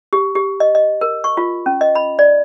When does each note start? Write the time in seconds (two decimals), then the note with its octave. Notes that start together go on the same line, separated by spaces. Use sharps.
0.13 G4
0.35 G4
0.60 D#5
0.75 D#5
1.01 A#4
1.24 C#6
1.37 F4
1.66 C#4
1.81 D#5
1.95 B5
2.19 D5